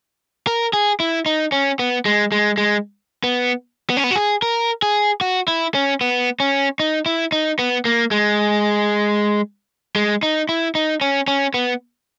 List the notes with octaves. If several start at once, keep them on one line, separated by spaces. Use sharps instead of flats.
A#4
G#4
E4
D#4
C#4
B3
G#3
G#3
G#3
B3
B3
C#4
B3
F#4
G#4
A#4
G#4
F#4
E4
C#4
B3
C#4
D#4
E4
D#4
B3
A#3
G#3
G#3
D#4
E4
D#4
C#4
C#4
B3